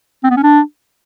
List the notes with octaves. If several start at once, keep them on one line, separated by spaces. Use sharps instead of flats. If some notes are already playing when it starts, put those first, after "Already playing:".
C4
B3
C#4
D4